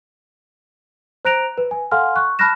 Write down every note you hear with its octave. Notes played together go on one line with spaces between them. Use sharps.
C5 A#5 F#6 A#6 D7 F7
B4
G#5
A4 F5 F#5 G#5 C6 F6
C#6 F#6
A5 B5 F6 F#6 A#6 E7